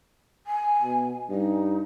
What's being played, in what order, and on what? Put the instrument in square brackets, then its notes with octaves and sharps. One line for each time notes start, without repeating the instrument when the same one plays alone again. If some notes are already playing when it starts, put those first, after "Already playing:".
[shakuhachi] G#5
[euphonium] B2
[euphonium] G2 [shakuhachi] D#4